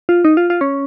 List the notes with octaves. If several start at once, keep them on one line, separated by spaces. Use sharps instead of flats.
F4
D#4
F4
F4
C#4